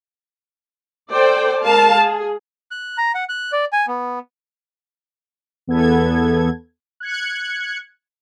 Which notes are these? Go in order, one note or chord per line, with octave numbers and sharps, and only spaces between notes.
A4 C5 D5 G5
G#3 A#4 F5 A5
G#4
F#6
A#5
F#5
F#6
D5
G#5
B3
E2 B3 A4 G#6
F#6 G#6 C#7